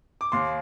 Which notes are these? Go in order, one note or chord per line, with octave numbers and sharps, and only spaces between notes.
D6
D#2 C6